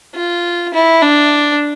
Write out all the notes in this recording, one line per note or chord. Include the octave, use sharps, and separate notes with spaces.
F4
E4
D4